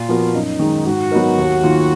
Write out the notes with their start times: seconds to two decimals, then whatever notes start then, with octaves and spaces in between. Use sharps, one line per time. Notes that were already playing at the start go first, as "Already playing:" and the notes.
Already playing: A#2 F4
0.08 F3 B3 F#4 A#4
0.34 F#2 D#4
0.59 D#3 G#3
0.86 G#2 F#4
1.12 F#3 B3 D#4 A#4
1.38 D#2
1.63 D#3 A#3 F4